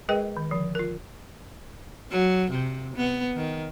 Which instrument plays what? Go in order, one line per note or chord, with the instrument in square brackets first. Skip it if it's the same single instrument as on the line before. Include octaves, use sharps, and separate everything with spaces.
[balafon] G#3 G#4 A#4 B4 D#5 G5
D#3
D3 F3
F4 A#4
[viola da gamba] F#3
C3
B3
D#3